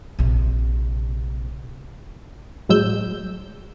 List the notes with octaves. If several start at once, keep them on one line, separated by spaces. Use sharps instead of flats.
A#1 C3
A2 F#3 G#3 E6 G6